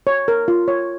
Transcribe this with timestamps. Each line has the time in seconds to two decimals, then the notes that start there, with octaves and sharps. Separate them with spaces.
0.07 C#5
0.28 A#4
0.48 F4
0.68 C#5